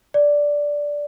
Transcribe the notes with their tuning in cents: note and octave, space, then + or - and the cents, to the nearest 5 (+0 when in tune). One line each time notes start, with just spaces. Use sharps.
D5 -5